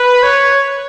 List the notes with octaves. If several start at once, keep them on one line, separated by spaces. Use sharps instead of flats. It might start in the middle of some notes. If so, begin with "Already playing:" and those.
Already playing: B4
C#5